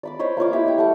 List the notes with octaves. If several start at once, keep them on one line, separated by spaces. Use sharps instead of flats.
D5 B5 D6
C5 C#5 D#5 B5
A#3 F4 C#5 D6
E4 G4 B5
D#5 G5
G3 A3 F#5